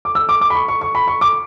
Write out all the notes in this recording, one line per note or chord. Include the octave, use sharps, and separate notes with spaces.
D6
E6
D6
D6
B5
C#6
C#6
C#6
B5
C#6
D6